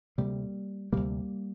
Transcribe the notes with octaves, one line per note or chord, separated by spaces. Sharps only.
D2 C3 G3 A#3
D2 C3 G3 A#3